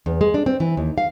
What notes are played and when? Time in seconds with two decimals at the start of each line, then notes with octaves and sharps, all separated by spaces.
0.06 E2
0.21 G#3
0.34 D4
0.46 C4
0.60 E3
0.77 D#2
0.98 F5